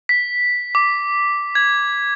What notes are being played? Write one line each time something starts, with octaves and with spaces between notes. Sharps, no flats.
B6
D6
G#6